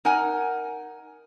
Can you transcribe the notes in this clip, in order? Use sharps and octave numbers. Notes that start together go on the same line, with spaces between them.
D#4 A#4 F#5 G#5